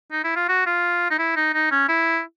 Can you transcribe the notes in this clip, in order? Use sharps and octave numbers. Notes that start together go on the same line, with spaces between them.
D#4
E4
F4
F#4
F4
D#4
E4
D#4
D#4
C#4
E4